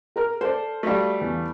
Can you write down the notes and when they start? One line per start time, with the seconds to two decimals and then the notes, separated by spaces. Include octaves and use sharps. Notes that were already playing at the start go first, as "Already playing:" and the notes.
0.16 A#4 A#5 F6
0.41 A4 C5 D5
0.83 G3 A3 F#4 F5
1.21 E2